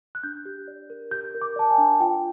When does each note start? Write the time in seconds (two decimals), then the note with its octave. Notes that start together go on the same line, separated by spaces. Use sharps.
0.15 F#6
0.23 D4 G6
0.45 G4
0.68 D5
0.90 A#4
1.11 G4 G6
1.34 A#4
1.42 D6
1.56 D5 A5
1.70 G#5
1.78 D4
2.00 F4 G5